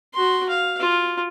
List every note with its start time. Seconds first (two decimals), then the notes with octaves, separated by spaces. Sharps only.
0.14 F#4 C6
0.49 F5
0.80 F4